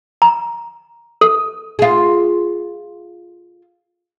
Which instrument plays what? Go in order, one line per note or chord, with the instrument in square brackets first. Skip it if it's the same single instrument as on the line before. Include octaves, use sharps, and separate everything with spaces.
[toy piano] A#5
A4
[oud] F4 G#4